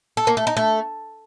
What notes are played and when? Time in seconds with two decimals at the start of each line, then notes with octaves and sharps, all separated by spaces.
0.17 A4
0.27 A#3
0.37 A3
0.47 D#4
0.57 A3